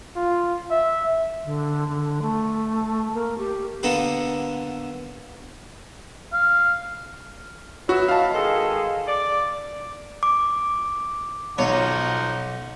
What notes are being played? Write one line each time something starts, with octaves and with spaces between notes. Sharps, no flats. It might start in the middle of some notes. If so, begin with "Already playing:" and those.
F4
E5
D3
D3
A3
A#3
G4
D3 A#3 B3 A4 B4
F5
F#3 B3 F#4 E5
D#5 F5 A5
D#3 G#3 G#4 A4
D5 D6
D6
B1 F3 D#4 C#5 F#5